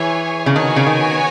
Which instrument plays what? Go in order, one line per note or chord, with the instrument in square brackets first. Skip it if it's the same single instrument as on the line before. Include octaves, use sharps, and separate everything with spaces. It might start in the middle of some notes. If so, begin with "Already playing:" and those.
Already playing: [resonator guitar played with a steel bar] E3 [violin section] G#4 C#5 G#5
[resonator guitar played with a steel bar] C#3
[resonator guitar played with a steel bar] D#3 [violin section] B3 F#4 C#5 G#5
[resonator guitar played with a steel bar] C#3
D#3